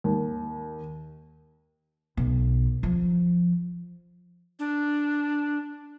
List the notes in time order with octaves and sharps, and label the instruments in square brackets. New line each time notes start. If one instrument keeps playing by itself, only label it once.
[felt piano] D#2
[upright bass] B1
F3
[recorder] D4